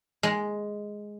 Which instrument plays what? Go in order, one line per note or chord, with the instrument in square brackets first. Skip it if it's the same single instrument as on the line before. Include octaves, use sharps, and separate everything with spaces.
[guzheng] G#3